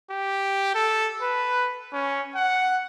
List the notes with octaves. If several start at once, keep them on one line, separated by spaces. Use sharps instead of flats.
G4
A4
B4
C#4
F#5